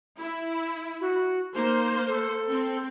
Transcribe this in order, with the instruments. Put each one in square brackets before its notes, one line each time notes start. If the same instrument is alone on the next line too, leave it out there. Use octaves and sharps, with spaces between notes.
[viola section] E4
[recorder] F#4
[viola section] A#3 C5 [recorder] D#4
[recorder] A4
[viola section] C4